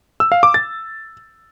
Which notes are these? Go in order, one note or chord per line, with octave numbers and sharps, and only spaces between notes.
E6
F5
D6
A6